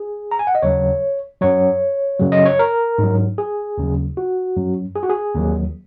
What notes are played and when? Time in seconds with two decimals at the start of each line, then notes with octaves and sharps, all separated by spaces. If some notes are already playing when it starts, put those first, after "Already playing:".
Already playing: G#4
0.31 A#5
0.39 G#5
0.47 F#5
0.55 D#5
0.62 D#2 C#3 F#3 C#5
1.41 F#2 F#3 C#5
2.20 F#2 C#3 F#3
2.32 D#5
2.45 C#5
2.59 A#4
2.98 G#2
3.04 F#3
3.38 G#4
3.78 D#2 C#3 F#3
4.17 F#4
4.57 F#2 F#3
4.96 G#4
5.03 F#4
5.09 G#4
5.35 D#2 D#3 F#3